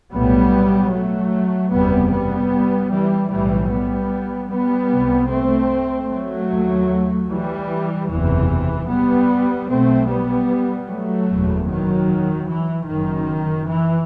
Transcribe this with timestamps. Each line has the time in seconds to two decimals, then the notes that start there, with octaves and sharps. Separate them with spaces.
0.12 B1 A2 G3 B3
0.92 F#3 A3
1.71 F#1 E2 C3 G3 B3
2.11 G3 B3
2.92 E3 G3
3.31 B1 A2 E3 G3
3.71 G3 B3
4.50 G3 B3
4.91 C2 C3
5.30 A3 C4
6.09 F#3 A3
6.50 D#2
7.30 E3 G3
8.09 F#1 E2 C3 E3
8.89 G3 B3
9.69 B1 B2 A3 C4
10.09 G3 B3
10.88 F#3 A3
11.29 F#1 E2 B2
11.68 D#3 F#3
12.48 E3
12.87 F#1 F#2 D#3
13.67 E3